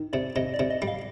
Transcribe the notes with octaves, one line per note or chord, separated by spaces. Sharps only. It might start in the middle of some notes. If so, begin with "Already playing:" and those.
Already playing: D#3
C3 D5
C3 D#5
D5
C3
D#5
G3
D#5 F5